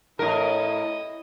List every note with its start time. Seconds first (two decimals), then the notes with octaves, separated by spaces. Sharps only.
0.19 A2 E4 A#4 D#5